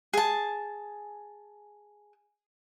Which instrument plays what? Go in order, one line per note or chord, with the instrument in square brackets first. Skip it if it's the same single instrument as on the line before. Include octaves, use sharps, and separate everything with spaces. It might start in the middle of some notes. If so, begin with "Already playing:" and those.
[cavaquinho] G#4 A5